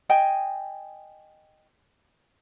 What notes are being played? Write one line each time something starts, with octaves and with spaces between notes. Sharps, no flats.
D#5 G5 G#5